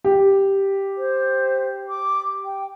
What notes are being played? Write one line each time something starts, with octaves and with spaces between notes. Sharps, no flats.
G4
C5
D6
G5